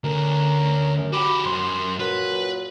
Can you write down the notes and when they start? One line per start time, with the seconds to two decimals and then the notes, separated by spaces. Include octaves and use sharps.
0.04 D2 C#4 A#4
0.96 F#2
1.13 F#4 G4 B5 D6
1.45 F#2 C6
2.00 A#2 F#3 B4